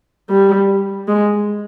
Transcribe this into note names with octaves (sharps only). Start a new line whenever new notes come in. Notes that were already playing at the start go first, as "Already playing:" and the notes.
G3
G#3